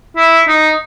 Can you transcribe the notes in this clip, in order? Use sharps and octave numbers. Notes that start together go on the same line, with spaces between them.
E4
D#4